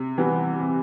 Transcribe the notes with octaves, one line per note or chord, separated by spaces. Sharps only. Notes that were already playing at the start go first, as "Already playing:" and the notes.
Already playing: C3
E3 G3 B3
C3